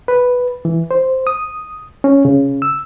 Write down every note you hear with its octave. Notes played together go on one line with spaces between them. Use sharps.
B4
E3
C5
D#6
C#4
C#3
E6